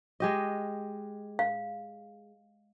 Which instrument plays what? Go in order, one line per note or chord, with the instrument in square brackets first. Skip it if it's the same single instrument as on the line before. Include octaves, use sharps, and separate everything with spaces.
[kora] G#3 G4 D#5
[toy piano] F5